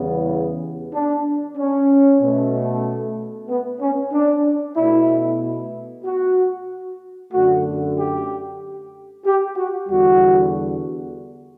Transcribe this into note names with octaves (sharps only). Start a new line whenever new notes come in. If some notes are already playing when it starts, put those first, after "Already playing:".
Already playing: E2 C#3 E3 G3 B3
D4
C#4
B2 A3
B3
C#4
D4
B2 A3 E4
F#4
F#2 D3 A3 F#4
G4
G4
F#4
E2 D3 G3 F#4